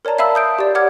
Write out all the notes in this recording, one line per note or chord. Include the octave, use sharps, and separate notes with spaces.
A#4 C#5 D5 A5 A#5
E5 F5 A5 B5 E6
D#6 G6 D7
G4 D5
C#5 F#5 D6 F6 G#6